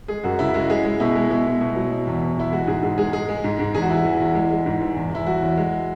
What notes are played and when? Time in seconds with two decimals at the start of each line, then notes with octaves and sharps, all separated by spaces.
0.08 G#3 G#4
0.24 F#2 F#4
0.39 C#3 E4
0.54 G#3 F#4
0.70 G#3 G#4
0.85 G#3
1.00 B2 E4
1.15 G#3
1.30 B2 E4
1.46 B2
1.61 B2
1.76 F#3
1.92 B2
2.07 E2
2.22 B2
2.37 E2 E4
2.52 G#3 F#4
2.67 G#2 G#4
2.83 G#2 G#4
2.98 G#3 G#4
3.13 G#3 G#4
3.29 G#3
3.44 G#2
3.59 G#2
3.74 E2 G#4
3.82 F#4
3.89 E3 E4
3.97 F#4
4.04 E3
4.20 E2
4.35 G#3
4.51 G#3
4.66 G#2
4.81 E3
4.96 E2
5.12 E2 E4
5.26 F#3 F#4
5.42 E2
5.57 G#3